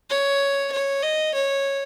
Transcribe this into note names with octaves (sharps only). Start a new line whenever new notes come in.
C#5
C#5
D#5
C#5